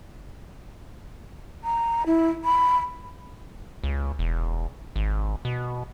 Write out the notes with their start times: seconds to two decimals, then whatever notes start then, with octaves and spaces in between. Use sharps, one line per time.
1.64 A#5
2.06 E4
2.44 B5
3.84 C#2
4.19 E1
4.96 G#1
5.45 B2